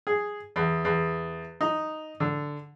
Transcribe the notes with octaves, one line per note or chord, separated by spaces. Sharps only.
G#4
E2
E2
D#4
D3